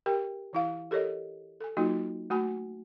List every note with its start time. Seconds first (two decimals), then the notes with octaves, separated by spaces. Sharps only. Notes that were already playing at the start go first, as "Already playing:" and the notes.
0.06 G4 A#4 G5
0.53 E3 E4 F5
0.91 G4 A4 A#4 C#5 D#5
1.60 A4 G#5
1.77 F#3 A#3 D#4 F4 F#4
2.30 A3 F#4 G#5 B5